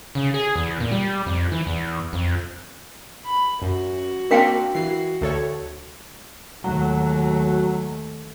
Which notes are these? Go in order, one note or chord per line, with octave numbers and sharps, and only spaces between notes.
C#3
G#4
E2
A#2
G3
F2
E3
E2
F2
B5
F#2 F#4
A#3 C4 D4 A#4 F5 G5
E3 F#4 C7
D2 A4 C#5
D#2 F#3 A3